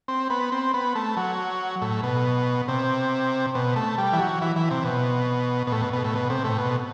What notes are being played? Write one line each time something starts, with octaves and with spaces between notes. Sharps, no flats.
C4
B3
C4
B3
A3
F#3
A2
B2
C3
B2
A3
G3
E3
F#3
E3
E3
C3
B2
B2
A2
B2
B2
A2
B2
C3
A2
B2